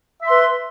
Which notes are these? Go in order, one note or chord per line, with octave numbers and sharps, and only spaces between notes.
B4 E5 C6